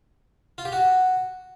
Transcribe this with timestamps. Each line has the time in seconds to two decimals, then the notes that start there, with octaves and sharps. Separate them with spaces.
0.58 F4
0.65 G4
0.72 F#4